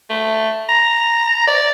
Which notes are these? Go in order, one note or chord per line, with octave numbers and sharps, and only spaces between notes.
A3
A#5
D5